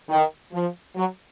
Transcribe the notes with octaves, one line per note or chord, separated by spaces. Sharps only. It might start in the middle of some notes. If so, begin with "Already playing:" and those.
D#3
F3
F#3